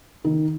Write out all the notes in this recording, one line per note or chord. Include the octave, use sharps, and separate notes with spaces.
D#3